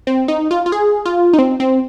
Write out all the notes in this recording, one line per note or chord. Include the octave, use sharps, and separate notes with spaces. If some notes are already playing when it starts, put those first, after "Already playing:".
C4
D#4
F4
F4
G#4
F4
D#4
C4
C4